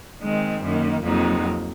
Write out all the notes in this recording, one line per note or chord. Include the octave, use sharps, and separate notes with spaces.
D#3 G#3 C4
F#2 D#3 A#3
F2 C3 F#3 A#3 D#4